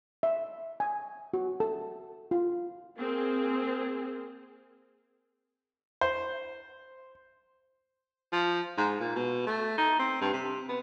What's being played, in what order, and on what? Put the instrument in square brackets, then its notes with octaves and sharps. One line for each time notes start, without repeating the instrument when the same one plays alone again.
[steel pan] E5
G#5
F#4
A4
F4
[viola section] A#3 C4 G#4
[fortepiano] C5
[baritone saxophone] F3
G#2
A#2
B2
A3
D#4
C4
G2
C3
B3